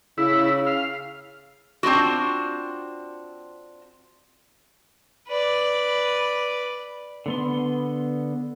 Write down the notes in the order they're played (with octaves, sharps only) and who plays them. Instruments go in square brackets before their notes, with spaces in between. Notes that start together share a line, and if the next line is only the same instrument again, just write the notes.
[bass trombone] C#3 [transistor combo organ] E4
[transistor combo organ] F5
[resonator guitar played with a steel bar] C4 D4 F4 F#4
[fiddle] B4 D5
[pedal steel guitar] D3 B3 C6